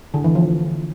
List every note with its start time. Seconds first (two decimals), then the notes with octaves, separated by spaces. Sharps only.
0.14 D3
0.24 E3
0.35 F3